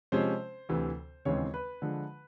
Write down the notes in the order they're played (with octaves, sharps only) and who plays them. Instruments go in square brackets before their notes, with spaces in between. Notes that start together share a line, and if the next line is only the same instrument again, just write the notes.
[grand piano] C3 F3 G#3 C#4 C5
D2 C3 E3
D#2 C#3 E3 G#3 C4 C#5
B4
D3 F3 G#3